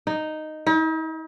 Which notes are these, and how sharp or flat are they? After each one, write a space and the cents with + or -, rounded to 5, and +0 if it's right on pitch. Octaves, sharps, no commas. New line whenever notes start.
D#4 -5
D#4 +45